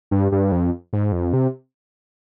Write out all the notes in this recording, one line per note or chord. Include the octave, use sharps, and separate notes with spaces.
G2
G2
F2
G#2
F2
C3